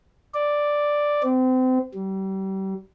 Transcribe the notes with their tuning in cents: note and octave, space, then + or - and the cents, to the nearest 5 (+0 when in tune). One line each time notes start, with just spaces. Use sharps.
D5 +0
C4 -30
G3 -35